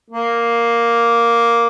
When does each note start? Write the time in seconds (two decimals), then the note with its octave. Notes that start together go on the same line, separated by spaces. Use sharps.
0.11 A#3